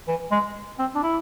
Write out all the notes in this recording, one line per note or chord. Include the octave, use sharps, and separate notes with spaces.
E3
G#3
C4
D4
E4